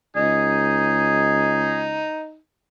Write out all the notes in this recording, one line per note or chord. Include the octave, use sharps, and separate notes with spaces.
C#2 D#4 G#4